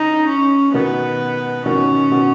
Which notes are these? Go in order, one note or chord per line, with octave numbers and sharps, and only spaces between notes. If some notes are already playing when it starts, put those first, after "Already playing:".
Already playing: C#3 D#4
C#4
B2 D#3 B3
B2 D#3 C#4
B2